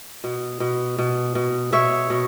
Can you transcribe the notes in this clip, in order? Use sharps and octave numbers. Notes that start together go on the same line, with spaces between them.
B2
B2
B2
B2
B2 C#5 E5
B2